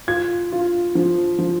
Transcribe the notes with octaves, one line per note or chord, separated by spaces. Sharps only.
F4 G#6
F4
F3
F3